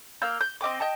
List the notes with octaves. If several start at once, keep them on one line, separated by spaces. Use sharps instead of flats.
A#3 F5 E6 G6
G6
C4 D#5 G5 D6
D#5 G5 A5